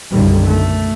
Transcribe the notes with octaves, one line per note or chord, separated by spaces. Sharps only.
B1 F#2 D3 D#3 G3
A3